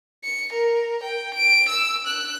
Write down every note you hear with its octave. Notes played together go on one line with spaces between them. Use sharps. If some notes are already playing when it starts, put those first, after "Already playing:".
C#7
A#4
G5
D7
E6
F#6